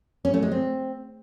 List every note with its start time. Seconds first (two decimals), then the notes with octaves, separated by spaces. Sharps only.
0.25 C#4
0.34 A3
0.43 G#3
0.51 C4